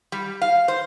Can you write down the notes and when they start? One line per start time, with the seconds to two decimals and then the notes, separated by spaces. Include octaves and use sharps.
0.12 G3
0.42 F5
0.68 C5